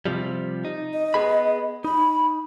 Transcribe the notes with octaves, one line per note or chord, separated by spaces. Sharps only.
C3 F3 G3
D#4
D#5
B3 G#4 B5
D#4 B5